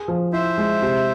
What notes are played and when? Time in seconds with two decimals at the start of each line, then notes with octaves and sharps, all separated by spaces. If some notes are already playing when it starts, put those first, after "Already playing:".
Already playing: G#4
0.08 F3
0.33 E4 C5 E5
0.58 G#3
0.82 C3